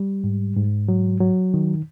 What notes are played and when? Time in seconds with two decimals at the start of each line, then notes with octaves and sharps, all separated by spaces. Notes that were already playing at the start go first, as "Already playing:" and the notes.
Already playing: G3
0.24 G#2
0.56 G#2
0.88 F#3
1.21 F#3
1.54 D#3